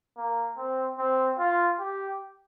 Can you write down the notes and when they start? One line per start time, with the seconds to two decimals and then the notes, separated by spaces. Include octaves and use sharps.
0.17 A#3
0.57 C4
0.98 C4
1.39 F4
1.80 G4